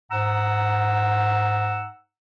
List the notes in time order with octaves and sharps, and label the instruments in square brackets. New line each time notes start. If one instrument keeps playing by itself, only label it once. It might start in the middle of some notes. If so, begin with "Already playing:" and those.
[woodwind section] G#2 F#5 A#5 E6